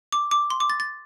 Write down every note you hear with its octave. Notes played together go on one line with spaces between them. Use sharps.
D6
D6
C6
D6
A6
A6